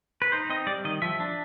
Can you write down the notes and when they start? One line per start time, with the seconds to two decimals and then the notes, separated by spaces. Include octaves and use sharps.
0.22 B4
0.32 D#4 C5
0.49 C4 D#5
0.67 G3 D5
0.85 D#3 D#5
1.02 F3 E5
1.20 D4